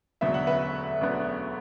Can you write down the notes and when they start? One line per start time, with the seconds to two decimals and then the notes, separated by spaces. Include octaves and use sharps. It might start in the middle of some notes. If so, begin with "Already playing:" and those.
0.21 E1 D2 D3 F#3 B3 E5
0.34 F#5
0.47 B4 E5
1.01 E1 D2 D3 F#3 B3